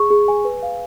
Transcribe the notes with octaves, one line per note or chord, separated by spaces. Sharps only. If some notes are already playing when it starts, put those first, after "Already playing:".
Already playing: G#4 C#6
G#4
G#5
B4
F5